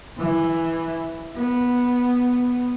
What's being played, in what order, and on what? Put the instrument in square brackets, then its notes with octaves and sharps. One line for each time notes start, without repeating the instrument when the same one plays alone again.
[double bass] E3
B3